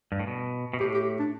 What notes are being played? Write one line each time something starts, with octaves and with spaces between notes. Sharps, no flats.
G2
A2
B2
B2
A2 G4
G4
D4